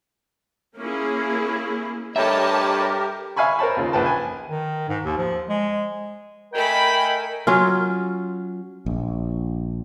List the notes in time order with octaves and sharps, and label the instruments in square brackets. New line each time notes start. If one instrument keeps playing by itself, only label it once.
[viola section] A#3 C#4 E4 G#4
[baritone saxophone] G2 [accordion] G4 A#4 [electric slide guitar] A4 E5 [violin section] C#5 D#5 A5
[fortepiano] E5 F5 G#5 B5 C#6
A#4 C5 C#5 A5 B5
D#2 C#3 F4
A#1 B4 G5 A5
G#5
[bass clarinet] D#3
G#2
D#2
F3
G#3
[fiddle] A3 B5 [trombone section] A#4 [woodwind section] D#5 G5 G#5
[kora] F#3 C#4 F4
[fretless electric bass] A#1